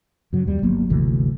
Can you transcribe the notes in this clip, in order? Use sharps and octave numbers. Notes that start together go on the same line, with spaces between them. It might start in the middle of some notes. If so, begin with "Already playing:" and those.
F#2 C#3 F#3
D#2 G3
G1 F#3 A#3 B3
G1 D2 C3 E3